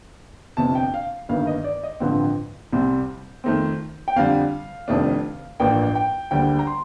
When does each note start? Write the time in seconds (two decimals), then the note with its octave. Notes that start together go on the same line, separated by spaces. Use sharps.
0.57 G1 F2 C3 A5
0.75 G5
0.94 F5
1.29 G1 G2 D#3 A#3 F5
1.47 D#5
1.64 D5
1.83 D#5
2.00 A1 G2 D3 F3 C4
2.73 C2 C3 G3 C4
3.44 F2 D#3 A3 C4
4.08 G5
4.16 F2 D3 G3 F5
4.88 F1 F2 D#3 A3 D4
5.60 A1 G2 F3 A#3 D4 G5
5.95 G5
6.31 D2 D3 G3 A#3 G5
6.59 A#5
6.67 C6